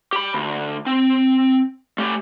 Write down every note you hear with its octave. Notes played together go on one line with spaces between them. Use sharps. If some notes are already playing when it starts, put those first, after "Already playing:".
G4 B5
D2
C4
A3 G4